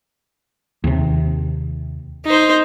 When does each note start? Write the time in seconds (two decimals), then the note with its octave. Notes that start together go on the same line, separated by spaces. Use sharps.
0.84 D#2 C3
2.26 D#4 C5